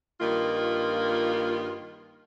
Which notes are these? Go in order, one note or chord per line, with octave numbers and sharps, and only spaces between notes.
G2 D#3 A#3 F4